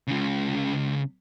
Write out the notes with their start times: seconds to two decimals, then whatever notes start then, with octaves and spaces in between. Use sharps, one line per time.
0.08 C#2 C#3